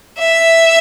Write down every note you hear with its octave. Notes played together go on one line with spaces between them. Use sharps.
E5